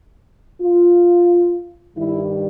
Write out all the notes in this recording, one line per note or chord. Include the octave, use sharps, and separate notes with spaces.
F4
G2 D#3 G3 E4